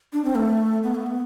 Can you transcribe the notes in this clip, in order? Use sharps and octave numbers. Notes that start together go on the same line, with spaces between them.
D4
C4
A3
B3
A3
B3